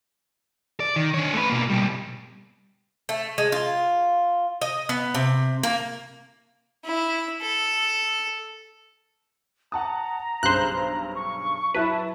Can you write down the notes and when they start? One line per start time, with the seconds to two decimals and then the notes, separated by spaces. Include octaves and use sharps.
0.80 D5
0.96 D#3
1.14 D4 C#5
1.34 A3 B4
1.50 B2 A#3
1.70 B2 G3
3.09 A3
3.38 G#3
3.52 F4
4.62 D#5
4.89 B3
5.15 C3
5.63 A#3
6.84 E4
7.41 A4
9.72 F#5 A5 A#5 D#6
10.43 B1 G2 C#3 C5 F#6
11.15 C#6
11.74 F#3 E4 B4 A5